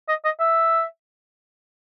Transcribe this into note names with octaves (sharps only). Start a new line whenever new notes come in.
D#5
D#5
E5